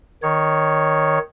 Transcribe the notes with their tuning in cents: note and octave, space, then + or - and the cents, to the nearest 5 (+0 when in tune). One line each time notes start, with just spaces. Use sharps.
D#3 +0 C#5 +0